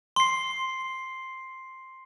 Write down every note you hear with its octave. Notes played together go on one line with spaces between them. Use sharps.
C6 C7